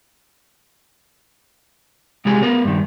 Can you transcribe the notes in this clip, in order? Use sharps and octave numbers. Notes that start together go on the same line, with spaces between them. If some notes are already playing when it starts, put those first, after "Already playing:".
C3 G#3 F4 G4 G#4
B3 A#4 B4
G2 D#3